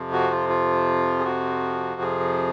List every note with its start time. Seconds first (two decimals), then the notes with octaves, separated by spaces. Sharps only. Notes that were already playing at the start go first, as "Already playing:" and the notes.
Already playing: F2 C3 F3
0.13 F#4
0.31 F4
0.49 F4
1.19 G#4
1.25 F#4
2.01 G#4